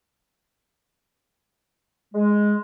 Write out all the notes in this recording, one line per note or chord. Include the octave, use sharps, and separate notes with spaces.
G#3